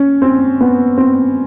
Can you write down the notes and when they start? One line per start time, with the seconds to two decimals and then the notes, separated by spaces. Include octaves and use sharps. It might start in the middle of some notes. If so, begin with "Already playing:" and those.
Already playing: C#4
0.22 C4
0.61 B3
0.98 C4